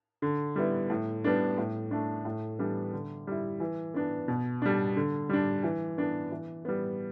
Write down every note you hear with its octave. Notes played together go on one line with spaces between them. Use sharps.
D3
G3 B3 E4
A2
G3 B3 D4
A2
A3 D4
A2
E3 G3 B3 D4
D3
G3 E4
E3
B3 D4
B2
G3 D4
D3
G3 D4
E3
B3 D4
E3
G3 B3